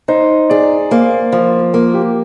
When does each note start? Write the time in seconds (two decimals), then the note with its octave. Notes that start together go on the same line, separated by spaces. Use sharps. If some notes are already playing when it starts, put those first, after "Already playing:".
0.08 D#4 C5
0.50 G#4 D5
0.91 A#3 C5
1.32 F3
1.74 A#3 A#4
1.94 G4